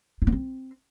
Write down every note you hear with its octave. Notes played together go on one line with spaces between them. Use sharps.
E4
B3
C4